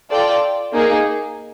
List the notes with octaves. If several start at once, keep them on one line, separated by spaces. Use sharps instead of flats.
F4 A4 D5 G5
A#3 D#4 G#4